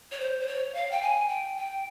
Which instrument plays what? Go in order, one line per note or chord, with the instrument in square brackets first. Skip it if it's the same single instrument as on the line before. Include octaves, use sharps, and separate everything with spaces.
[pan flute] C#5
C5
C5
C#5
F5
G5
G#5
G5
G5